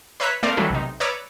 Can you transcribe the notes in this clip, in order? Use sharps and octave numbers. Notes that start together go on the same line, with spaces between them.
B4 C#5 E5 A#5 F#6 B6
A3 A#3 C4 A#4 D5
D#3 E3 F#3 G3 A3 D4
B1 C3 D#4
B4 C#5 D5 A#5 D6 E6